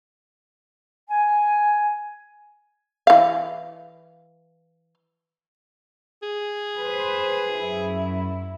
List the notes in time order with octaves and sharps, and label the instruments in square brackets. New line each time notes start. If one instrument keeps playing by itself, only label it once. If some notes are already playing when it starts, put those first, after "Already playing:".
[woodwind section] G#5
[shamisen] E3 F5
[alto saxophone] G#4
[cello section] B4 C5
F#2 E4